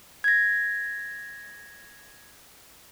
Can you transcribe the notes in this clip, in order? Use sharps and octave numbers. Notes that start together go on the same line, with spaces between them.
G#6 A#6